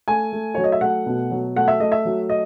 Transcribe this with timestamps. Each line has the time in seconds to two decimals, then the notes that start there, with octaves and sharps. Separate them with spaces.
0.08 A3 G#5
0.33 A3
0.55 F#3 C#5
0.64 D#5
0.72 E5
0.81 A3 F#5
1.06 B2
1.31 F#3
1.56 A3 F#5
1.68 E5
1.80 A3 D#5
1.92 E5
2.05 F#3
2.29 D#5